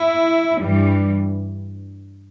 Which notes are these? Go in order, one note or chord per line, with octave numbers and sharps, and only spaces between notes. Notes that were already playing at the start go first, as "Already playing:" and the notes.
Already playing: E4
G2 E3 G3